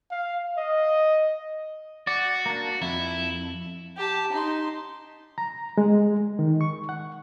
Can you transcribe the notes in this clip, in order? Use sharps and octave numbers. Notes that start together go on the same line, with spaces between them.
F5
D#5
F#4 D5
A#3 D4
F2 E4
G4 A5
D#4 C6
A#5
G#3
D#3
C#6
F#5